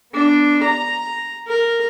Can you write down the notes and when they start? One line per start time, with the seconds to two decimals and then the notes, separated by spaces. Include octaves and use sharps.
0.13 B3 D4
0.64 A#5
1.48 A#4